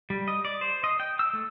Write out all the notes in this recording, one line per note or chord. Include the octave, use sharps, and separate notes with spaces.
G3
D#5
D5
C5
D#5
G5
E6
A3